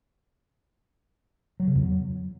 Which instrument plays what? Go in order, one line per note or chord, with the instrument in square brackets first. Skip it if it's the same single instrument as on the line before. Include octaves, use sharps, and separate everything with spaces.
[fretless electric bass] F#3
C#3
E2
F#3